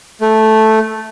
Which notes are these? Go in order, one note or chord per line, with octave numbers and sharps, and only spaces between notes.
A3